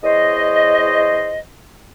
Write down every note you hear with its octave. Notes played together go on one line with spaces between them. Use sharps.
E2 C5 C#5 D#5